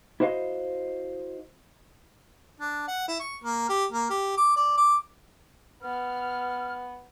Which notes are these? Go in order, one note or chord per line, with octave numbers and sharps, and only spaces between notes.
E4 F#4 C5 D#5 F5
D4
F#5
E4
C#6
A#3
G4
A#3
G4
D6
D5
D6
B3 F6